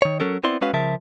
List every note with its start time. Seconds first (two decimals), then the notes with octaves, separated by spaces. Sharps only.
0.02 D#3 C#5
0.20 F#3 C#4 A4 A#4
0.44 B3 C4 E4 D5 C6
0.61 G#3 B3 C#4 F#4 B4 F5
0.73 C#2 C#3 F3 A#4 E5 A5